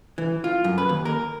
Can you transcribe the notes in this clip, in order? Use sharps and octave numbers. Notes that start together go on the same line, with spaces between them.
E3
F4
F#2
B4
D#2
A#4